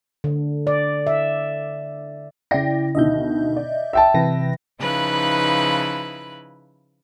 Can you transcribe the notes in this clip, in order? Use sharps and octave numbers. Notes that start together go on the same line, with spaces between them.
D3
D5
E5
C#3 E4 D5 G5 A#6
D2 B2 D#3 D#5 E5 G6
D5
E5 G5 A5
C3 E3 B4 A#6
C#3 F3 D#4 E4 B4 F#6